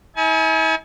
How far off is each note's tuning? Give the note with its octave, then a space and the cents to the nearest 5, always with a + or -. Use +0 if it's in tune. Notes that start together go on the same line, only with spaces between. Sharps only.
E4 -45 G#5 +30